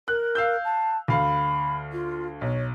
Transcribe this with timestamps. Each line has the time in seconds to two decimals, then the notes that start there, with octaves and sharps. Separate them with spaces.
0.08 A#4 F#6
0.35 F5 E6 G6
0.64 A5
1.08 D2 F5 B5
1.92 F4
2.41 B1 C#5